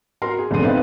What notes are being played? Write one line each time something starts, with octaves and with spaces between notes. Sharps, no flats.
F#4 A#4 A#5 C6
G#4
F1 A#1 D3 B3 C6 D#7
C4 D#4 B4 D5 E5 F5